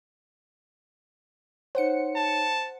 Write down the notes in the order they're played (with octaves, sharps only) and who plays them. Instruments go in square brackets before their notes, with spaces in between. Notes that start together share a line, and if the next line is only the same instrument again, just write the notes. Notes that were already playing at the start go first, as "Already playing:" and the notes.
[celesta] D#4 C#5 [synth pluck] C5 F#5 C#7
[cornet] A5